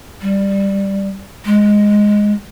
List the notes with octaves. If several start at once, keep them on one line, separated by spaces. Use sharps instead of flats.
G3
G#3